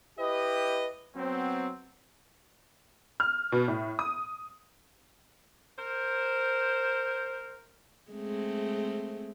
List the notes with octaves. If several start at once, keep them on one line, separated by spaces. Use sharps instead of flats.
E4 G4 B4 D#5
F#3 B3 C4
F6
B2
A2
D#6
A#4 C5
G#3 A3 C4